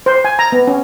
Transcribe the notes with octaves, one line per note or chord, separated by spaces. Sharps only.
C5
G#5
A#5
B3
C#4